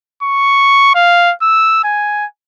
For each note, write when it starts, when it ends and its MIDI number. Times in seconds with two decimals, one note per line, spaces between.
0.23 0.90 85
0.95 1.32 77
1.42 1.83 88
1.84 2.25 80